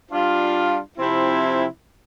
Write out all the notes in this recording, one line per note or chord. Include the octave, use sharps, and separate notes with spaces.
G3 D4 F4
C3 F3 C4 E4